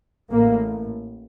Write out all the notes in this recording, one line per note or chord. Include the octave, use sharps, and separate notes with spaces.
A1 A2 A#3